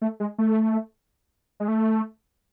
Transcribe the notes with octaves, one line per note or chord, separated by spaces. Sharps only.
A3
G#3
A3
G#3
A3